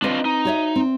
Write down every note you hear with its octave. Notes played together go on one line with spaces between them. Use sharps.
C4 D4 F4 B4 C5 D#5
D#4
F#4 C#5 E5
C4